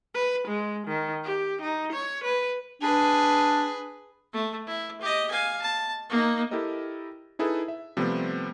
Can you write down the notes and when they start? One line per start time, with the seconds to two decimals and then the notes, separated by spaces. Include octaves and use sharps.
0.14 B4
0.48 G#3
0.87 D#3
1.24 G4
1.62 D#4
1.93 C#5
2.24 B4
2.82 D4 G#4 B4
4.33 A3
4.67 E4
5.01 G4 D#5
5.31 F5 G#5
5.61 A5
6.10 A#3 D#4
6.51 E4 G4 A4 A#4 D#5
7.39 D#4 E4 G#4 A4 B4
7.68 E5
7.97 C3 F3 G3 A3 B3 C4